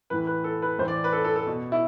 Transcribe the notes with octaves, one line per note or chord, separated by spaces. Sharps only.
A2 E3 B4
B4
A4
B4
A2 E3 C5
D5
B4
A4
A4
A4
B2
E4